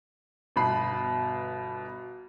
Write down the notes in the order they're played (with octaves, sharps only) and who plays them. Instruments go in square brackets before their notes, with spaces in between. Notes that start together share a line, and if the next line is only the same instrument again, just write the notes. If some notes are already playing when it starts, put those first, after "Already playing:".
[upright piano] G1 B2 B5 C7